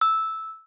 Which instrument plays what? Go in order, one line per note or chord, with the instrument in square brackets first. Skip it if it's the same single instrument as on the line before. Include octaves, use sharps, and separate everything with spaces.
[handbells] E6